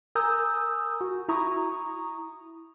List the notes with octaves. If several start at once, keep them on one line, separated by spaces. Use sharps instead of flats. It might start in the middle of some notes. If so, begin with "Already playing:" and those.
A#4 G#5 A#5 D#6 E6 G6
F#4
E4 A#5 C#6 D#6